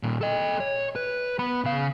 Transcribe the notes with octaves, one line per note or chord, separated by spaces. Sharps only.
A#2 D#3
A4 D#5
C#5
B4
B3 B5
C#3 F5